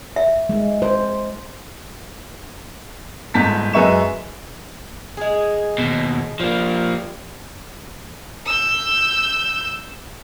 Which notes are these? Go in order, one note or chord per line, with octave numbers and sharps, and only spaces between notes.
E5
G#3
C5
G1 G#2 A5 B6
F#2 G#3 B4 E5 C#6 E7
G#3 G#4
D#2 B2
F3 G3 A#3
E6 G6